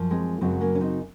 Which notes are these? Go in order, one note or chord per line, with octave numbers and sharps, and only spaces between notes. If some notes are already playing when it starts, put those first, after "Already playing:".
Already playing: F#2 F3
G#3 C4
F#2 C#3 F#3 G#3 C4
A#3 C#4
C#4
C4 D#4